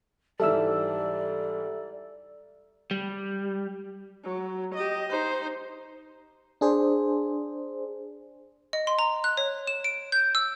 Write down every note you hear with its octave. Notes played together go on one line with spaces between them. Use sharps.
G#2 E3 G3 A4 D5 E5 E6
G3
F#3
G4 D#5
D#4 C5
D4 G#4 C5
D#5
C6
A#5
F#6
C#5
E7
D7
G6
E6